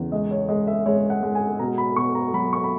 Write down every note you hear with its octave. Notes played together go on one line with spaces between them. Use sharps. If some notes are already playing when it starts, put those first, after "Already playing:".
Already playing: E2 C#3
G#3 D#5
C#5
G#3 D#5
E5
G#3 C#5
F#5
G#3
G#5
B2 A#5
B5
B2 C#6
A#5
F#3 B5
C#6
B5